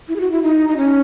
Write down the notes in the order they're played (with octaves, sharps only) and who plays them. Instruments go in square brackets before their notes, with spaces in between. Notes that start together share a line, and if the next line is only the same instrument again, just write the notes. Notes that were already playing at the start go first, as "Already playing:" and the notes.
[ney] E4
G#4
F#4
E4
D#4
D#4
C#4